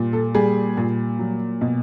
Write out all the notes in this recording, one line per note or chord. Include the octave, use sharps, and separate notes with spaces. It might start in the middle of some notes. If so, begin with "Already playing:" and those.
Already playing: A#2 G3
A4
G3 G#4
A#2
F#3
B2